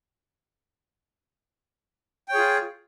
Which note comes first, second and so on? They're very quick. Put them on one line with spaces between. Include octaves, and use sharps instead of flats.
G5 C#5 G#4 F4